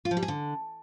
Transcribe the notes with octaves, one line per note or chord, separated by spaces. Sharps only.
F4
F3
G3
G#4
D3